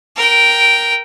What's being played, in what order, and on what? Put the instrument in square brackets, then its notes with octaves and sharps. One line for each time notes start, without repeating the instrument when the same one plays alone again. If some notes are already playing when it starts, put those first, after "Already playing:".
[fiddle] A#4 G5